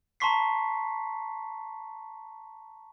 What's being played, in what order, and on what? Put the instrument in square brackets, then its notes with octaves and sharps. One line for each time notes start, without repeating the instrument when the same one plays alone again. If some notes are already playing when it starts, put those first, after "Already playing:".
[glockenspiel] A5 A#5 C6 C#6 B6 C7